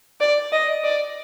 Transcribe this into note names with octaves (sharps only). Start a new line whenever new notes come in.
D5
D#5
D5